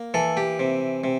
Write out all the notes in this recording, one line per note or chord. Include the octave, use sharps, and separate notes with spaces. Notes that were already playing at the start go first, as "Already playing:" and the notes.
Already playing: A#3
E3 A4
G4
C3
C3